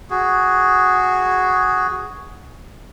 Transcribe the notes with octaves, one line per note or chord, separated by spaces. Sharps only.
F#4 G#4